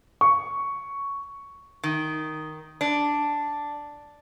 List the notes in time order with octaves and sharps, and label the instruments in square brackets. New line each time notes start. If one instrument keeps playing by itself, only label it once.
[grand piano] C#6
[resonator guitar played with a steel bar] D#3
D4